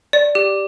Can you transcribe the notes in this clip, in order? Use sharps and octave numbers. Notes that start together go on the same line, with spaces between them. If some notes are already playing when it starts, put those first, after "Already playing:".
D5
G4